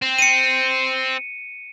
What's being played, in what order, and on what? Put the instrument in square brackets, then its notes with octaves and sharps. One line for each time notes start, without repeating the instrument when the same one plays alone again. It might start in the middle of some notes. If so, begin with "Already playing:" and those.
[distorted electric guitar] C4
[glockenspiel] C#7 D#7